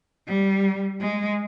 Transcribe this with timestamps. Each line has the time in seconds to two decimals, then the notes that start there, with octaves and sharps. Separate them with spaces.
0.28 G3
1.01 G#3